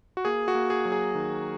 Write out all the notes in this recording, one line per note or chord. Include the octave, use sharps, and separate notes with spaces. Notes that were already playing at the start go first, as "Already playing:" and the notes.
F#4
A#3 G#4
F#4
A#3
G#4
F#3
G#4
D#3